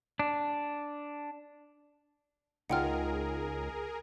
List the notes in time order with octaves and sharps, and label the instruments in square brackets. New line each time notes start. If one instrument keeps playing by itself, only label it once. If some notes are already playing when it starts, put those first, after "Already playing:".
[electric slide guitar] D4
[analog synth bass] C#2 [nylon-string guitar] D#4 F4 [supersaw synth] G#4 A#4 [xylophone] F#5 G5 F6